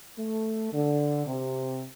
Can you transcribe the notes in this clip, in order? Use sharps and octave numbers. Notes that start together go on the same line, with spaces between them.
A3
D3
C3